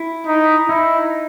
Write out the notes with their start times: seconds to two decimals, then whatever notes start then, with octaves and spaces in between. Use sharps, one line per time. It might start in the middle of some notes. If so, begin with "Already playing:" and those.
Already playing: E4
0.27 D#4
0.69 D#4 E4